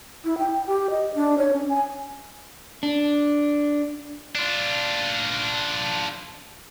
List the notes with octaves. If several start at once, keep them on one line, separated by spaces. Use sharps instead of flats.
E4
G5
G4
D#5
D4
C#5
C#4
G#5
D4
D4 F4